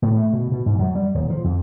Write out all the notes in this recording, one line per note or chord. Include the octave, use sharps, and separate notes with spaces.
A2
A3
B2
B2
G#2
F#2
G3
D#1
F3
F2